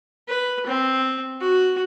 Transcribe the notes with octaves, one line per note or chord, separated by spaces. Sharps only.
B4
C4
F#4